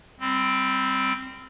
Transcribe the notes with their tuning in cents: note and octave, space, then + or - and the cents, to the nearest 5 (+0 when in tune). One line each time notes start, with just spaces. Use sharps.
G3 +0 C4 +0 C6 -40